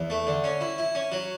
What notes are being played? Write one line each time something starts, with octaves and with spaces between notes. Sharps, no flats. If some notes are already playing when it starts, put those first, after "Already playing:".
Already playing: E2
A3
D3
C#4
E4
E4
C#4
F#3